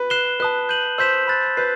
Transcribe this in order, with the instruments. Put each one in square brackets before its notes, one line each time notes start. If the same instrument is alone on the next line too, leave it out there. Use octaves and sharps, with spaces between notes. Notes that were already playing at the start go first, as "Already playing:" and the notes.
Already playing: [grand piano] B4
[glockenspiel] F#6 C7 E7 G7
[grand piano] B4 [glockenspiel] A5 D#6 F#6
[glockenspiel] G6 D#7 F#7
[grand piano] C5 [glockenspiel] E6 G6 B6 E7
[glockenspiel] B5 F#6 A6
[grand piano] B4 [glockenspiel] G6 C7